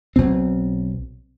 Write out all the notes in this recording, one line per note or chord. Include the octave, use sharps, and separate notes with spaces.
B1 B2 C4